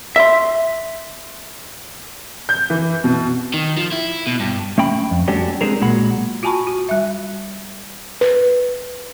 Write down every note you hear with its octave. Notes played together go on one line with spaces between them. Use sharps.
E5 C6
G6
E3
B2
D#3
F3
E4
B2
G2
A3 C#4 G5 B5
F2
G3 A3 C#4 D4 F#4 G4
G#3 C4 D4 G#4 A#4
B1 A#2 G#3 F#4 B5
F4 F#4 G#5 A5 B5 C#6
F#4
G3 E5
B4